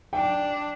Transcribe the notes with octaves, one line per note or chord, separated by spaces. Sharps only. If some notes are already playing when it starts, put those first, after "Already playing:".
D4 G5